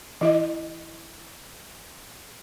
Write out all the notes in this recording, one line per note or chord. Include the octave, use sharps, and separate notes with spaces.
E3 E4 D#5